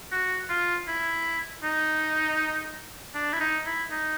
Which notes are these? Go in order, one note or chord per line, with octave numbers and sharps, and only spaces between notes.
F#4
F4
E4
D#4
D4
E4
D#4
E4
D#4